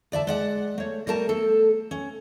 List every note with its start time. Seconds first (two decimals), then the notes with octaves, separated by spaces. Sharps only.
0.12 D2 D5 E5 A5
0.27 G#3 D5 F#5
0.78 A3 C#5
1.07 G3 A3 A#4 A5
1.29 A3 A4
1.91 C#4